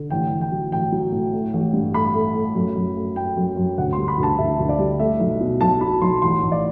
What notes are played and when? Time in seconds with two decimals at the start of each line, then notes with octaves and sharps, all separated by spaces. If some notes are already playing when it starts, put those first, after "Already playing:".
Already playing: D3
0.10 A1 G5
0.31 A1
0.41 G5
0.52 F#3
0.72 A1 G5
0.92 F#3
1.12 A2
1.33 A3
1.53 A1
1.74 G2
1.94 A3 B5
2.15 A3
2.35 A3
2.55 F#2
2.76 F#2
2.96 A3
3.16 A3 G5
3.36 F#2
3.57 F#2
3.78 D2 F#5
3.93 C6
3.98 G3
4.08 B5
4.18 D2
4.23 A5
4.38 D2 E5
4.59 D2
4.69 D5
4.79 G3
4.99 A3 E5
5.20 B1
5.41 B2
5.61 B1 A5
5.81 F#3 B5
6.02 B1 C6
6.22 A1 C6
6.42 A1
6.52 D5